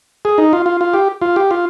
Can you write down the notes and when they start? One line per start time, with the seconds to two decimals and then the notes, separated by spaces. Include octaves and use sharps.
0.25 G#4
0.38 D#4
0.53 F4
0.66 F4
0.81 F4
0.94 G4
1.22 F4
1.36 G4
1.51 F4